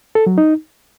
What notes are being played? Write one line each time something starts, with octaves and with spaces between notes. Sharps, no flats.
A4
F#3
D#4